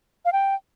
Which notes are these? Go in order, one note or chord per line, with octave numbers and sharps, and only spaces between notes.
F5
G5